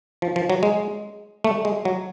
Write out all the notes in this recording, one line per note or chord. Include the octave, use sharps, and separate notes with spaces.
F3
F3
F#3
G#3
A3
G#3
F#3